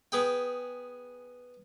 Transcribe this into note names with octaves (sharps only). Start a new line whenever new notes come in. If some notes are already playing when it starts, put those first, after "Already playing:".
B3 G#4 G5